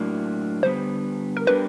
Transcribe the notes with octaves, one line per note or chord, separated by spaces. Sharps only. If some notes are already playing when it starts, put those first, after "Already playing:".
Already playing: A2 F#3 A#3 D4
D3 G3 B3 C5
A#4
G3 B3 D4 G4 A#4 B4